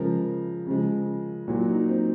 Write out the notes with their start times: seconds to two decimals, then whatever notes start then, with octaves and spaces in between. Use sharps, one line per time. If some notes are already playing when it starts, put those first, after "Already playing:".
Already playing: C#3 F3 G#3 A#4
0.67 C#3 F3 G#3
1.48 A#2 F#3 F#4
1.68 D#4
1.88 C4